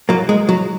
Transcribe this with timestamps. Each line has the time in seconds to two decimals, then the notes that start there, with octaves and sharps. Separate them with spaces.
0.09 F#3 A#3
0.29 G#3
0.49 F#3